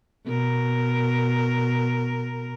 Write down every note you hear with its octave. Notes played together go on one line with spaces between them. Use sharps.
B2 A#4